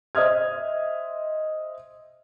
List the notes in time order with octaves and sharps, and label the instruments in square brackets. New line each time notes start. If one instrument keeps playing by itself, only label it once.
[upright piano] C5 D#5 E5 D#6 F6 G#6